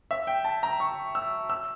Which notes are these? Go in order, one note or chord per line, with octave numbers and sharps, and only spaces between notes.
E5
G5
A5
A#5
C#6
E6
E6